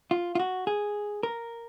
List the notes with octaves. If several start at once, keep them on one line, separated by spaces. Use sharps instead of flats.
F4
F4
F#4
G#4
A#4